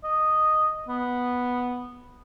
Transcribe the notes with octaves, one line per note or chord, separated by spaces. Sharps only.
D#5
B3